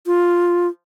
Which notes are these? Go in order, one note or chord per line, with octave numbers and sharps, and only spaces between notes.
F4